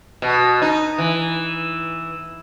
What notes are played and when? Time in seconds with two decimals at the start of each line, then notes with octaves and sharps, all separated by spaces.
0.22 B2
0.62 D#4
0.98 E3